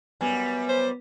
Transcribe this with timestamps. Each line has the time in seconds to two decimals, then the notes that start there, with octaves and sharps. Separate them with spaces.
0.21 F#2 G3 B3 G#5
0.69 C5